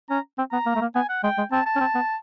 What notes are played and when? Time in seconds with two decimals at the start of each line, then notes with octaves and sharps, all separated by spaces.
0.10 C#4 A#5
0.38 C4
0.52 B3 A#5
0.66 A#3
0.76 A3
0.81 A#3
0.95 B3 G#5
1.09 F#5
1.24 G#3 G5
1.38 G#3
1.52 C4 A5
1.66 A5
1.76 C#4
1.80 C4
1.95 B3